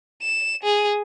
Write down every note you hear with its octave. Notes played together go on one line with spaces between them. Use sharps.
E7
G#4